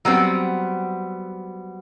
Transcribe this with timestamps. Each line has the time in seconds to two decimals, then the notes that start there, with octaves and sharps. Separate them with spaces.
0.05 F#3 G3 B3 C4